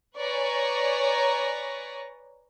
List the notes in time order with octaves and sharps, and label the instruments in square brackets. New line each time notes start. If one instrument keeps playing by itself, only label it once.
[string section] B4 C#5 D5 G#5 A#5 C#6